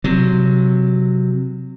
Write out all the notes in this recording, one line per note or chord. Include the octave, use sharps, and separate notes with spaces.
C3 F#3